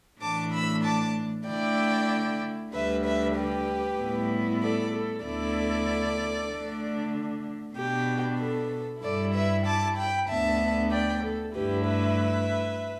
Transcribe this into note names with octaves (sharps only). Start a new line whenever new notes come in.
A2 E3 A3 D4 A5 D6
B5 E6
A5 D6
D3 A3 E4 D5 G5
D2 D3 G3 B4 E5
B4 E5
G4 B4
A2 G3 B3 E4
A4 D5
A4
D2 D3 B3 E4 A4 D5
D3 A3 D4
B2 B3 D4 G4
A4
G2 G3 E4 A4 D5
B4 E5
A5 D6
G5 B5
D2 D3 B3 E5 A5
D5 G5
A4
G2 D3 A3 E4 G4 B4
B4 E5